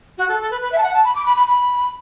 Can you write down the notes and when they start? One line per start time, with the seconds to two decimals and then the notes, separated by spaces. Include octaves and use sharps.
0.18 F#4
0.29 A4
0.40 A4
0.51 B4
0.61 B4
0.72 E5
0.78 A5
0.83 F#5
0.94 A5
1.04 B5
1.15 D6
1.26 B5
1.37 B5
1.47 B5